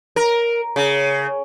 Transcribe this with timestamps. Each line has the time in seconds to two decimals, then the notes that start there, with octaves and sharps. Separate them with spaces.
0.16 A#4
0.76 C#3